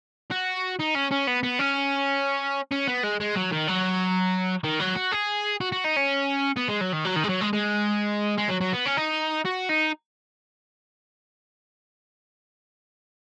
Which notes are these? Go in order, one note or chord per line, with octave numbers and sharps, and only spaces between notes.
F#4
D#4
C#4
C#4
B3
B3
C#4
C#4
B3
G#3
G#3
F#3
D#3
F#3
D#3
F#3
F#4
G#4
F#4
F#4
D#4
C#4
B3
G#3
F#3
D#3
F#3
D#3
G#3
F#3
G#3
G#3
G#3
F#3
F#3
B3
C#4
D#4
F#4
D#4